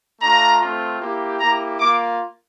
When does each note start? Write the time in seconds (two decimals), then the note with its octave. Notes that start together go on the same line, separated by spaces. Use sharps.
0.21 A3 D4 F4 A#5
0.61 A3 C4 F4
1.00 A#3 E4 G4
1.40 A#3 E4 G4 A#5
1.79 A#3 F4 D6